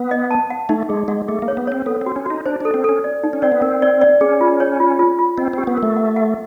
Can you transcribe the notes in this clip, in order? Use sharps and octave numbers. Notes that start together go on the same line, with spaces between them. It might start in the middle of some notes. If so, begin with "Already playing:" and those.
Already playing: B3
D#5
A5
F#5
A3 D#4
G#3 G#4
G#3 F#5
A3 G#4
A#3
C#5
B3
C4 C#5
B3 A4
C4 F#4
C#4
D#4 F#4
D4 C5
D4 A4
C4
C#4 A4
D5
D#4
C#4
C4 D5
B3
C4 A#4
D5
D5
C#4 G#4
F4
C#5
F4
F4
F4
C4 D#5
C4 G4
B3
A#4
A3
F#5
F#5